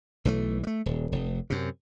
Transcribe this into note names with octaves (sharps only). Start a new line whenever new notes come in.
B1 E3 G#3 A3
G3 A3
D#1
F1
F#2 C3